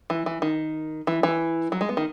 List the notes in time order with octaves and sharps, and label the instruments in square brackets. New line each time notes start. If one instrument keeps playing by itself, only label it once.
[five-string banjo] E3
E3
D#3
E3
E3
F#3
G#3
B3
D#3